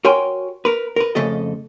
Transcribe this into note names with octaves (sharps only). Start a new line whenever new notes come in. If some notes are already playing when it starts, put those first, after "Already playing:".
F#4 A#4 C#5 G5 G#5 C6
A#4 B4
A#4 B4
F2 C#3 A3 A4 D#5